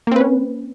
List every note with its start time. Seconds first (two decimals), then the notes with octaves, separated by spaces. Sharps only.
0.07 A#3
0.12 C4
0.16 B4
0.20 C#4